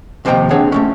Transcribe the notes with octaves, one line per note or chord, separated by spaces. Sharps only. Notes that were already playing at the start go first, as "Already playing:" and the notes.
D#2 C3 F3 A4 G5 A#5
C4 D4 G#4 C#5 F#5
A3 C4 C#4